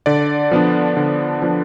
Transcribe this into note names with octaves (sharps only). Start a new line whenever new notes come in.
D3 D5
F3 B3 D4
D3
F3 B3 D4